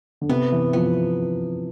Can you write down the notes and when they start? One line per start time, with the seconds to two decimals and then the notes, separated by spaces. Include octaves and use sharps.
0.21 D3
0.29 C3 B3
0.52 E3
0.73 F3 B3